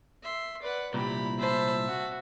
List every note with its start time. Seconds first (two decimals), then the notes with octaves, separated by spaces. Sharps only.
0.22 E5 C6
0.62 B4 D5 F#5
0.94 C2 A#2 E4 G4 B5
1.39 C5 E5 A5 B5
1.88 F#4